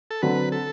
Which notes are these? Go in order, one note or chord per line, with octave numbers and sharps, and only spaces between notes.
A4
D3 F#3 C4 B4
A4